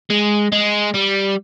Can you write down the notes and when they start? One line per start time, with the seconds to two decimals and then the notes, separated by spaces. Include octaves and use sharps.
0.10 G#3
0.52 G#3
0.94 G3